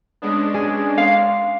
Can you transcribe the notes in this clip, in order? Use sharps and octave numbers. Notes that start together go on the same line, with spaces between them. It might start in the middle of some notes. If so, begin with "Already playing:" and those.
G#3 B3 C#4 D4
G#4
F5 C6